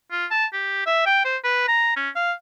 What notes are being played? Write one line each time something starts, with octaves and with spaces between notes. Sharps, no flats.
F4
A5
G4
E5
G5
C5
B4
A#5
C#4
F5